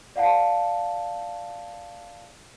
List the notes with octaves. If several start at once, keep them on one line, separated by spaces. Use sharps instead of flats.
D5 F5 F#5 A5